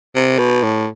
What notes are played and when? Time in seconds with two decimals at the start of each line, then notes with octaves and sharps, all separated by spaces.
0.15 C3
0.39 B2
0.63 A2